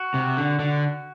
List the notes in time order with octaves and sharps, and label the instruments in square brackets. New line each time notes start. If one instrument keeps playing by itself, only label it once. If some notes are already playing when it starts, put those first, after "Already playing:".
Already playing: [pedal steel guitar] F#4
[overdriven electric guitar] C3
D3
D3